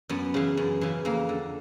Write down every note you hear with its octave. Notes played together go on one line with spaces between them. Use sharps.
F#2 B3
C#3 E3
F#2
C#3 E3
F2 A#3
D3